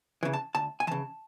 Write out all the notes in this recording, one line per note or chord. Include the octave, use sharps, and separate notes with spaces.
C#3 E3
A5
D2 A5
G#5
C#3 E3 A5